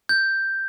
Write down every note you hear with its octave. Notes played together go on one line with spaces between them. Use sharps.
G6